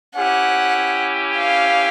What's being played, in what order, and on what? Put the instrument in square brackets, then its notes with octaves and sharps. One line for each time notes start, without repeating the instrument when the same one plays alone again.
[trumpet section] C#4 E4 G4 [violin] F#5
[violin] F5